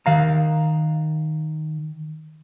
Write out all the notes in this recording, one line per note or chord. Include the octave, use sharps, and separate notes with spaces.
D#3 F5 A#5